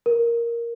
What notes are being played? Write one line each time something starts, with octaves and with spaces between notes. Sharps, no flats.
A#4